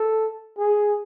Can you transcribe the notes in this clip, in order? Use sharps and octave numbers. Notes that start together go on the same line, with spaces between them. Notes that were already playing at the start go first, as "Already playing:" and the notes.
Already playing: A4
G#4